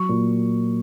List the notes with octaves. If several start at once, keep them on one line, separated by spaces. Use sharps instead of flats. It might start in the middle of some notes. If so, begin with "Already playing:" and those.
Already playing: F#3 C#6
A#2